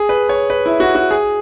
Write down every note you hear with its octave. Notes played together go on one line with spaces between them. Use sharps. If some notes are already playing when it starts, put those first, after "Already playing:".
Already playing: G#4
B4
C#5
B4
E4
F#4
F#4
G#4